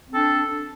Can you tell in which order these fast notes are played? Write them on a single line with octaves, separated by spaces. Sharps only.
C4 A4 D4